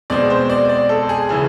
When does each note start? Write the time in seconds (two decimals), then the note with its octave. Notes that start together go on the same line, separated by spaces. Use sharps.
0.10 B2 G#3 C4 D5
0.30 C5
0.50 D5
0.69 D5
0.89 A4
1.09 G#4
1.29 C#3 E3 G#4